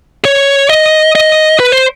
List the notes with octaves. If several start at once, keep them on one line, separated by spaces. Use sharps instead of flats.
C#5
D#5
D#5
B4
C5